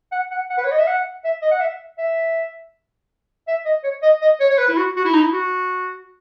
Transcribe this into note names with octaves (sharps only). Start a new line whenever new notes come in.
F#5
F#5
F#5
B4
C#5
D#5
E5
F#5
E5
D#5
F#5
E5
E5
E5
D#5
C#5
D#5
D#5
C#5
C#5
B4
E4
F#4
F#4
E4
D#4
E4
F#4